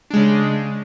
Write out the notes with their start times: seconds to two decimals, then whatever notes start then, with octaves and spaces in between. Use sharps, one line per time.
0.10 D4
0.13 G#3
0.16 C#3